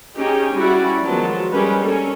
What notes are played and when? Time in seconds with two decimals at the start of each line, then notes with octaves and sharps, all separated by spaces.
0.16 C#4 D#4 G4 G#4
0.53 G3 C#4 E4 F#4 D5
1.04 D#3 F3 F#3 G#3 B3 A5
1.51 G3 G#3 C#4 G4 A#4 B4
1.81 C#4 A4 A#4